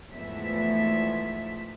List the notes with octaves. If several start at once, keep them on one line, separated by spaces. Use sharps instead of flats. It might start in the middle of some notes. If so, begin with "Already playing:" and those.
E2 G#2 F3 A3 E5